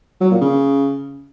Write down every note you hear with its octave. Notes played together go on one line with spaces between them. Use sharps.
F#3
A#2
C#3